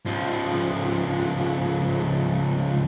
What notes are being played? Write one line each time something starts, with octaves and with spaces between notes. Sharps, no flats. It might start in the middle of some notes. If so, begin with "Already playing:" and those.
C#2 F3